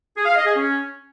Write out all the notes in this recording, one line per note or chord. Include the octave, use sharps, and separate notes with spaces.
G#4
F5
D#5
G#4
C#4